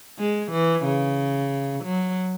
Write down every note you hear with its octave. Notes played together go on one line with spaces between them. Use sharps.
G#3
E3
C#3
F#3